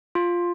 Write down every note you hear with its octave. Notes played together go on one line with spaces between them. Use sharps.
F4